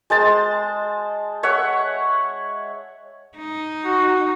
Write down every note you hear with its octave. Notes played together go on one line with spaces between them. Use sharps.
G#3 C5 A5
C#5 E5 F#5
D#4
F#4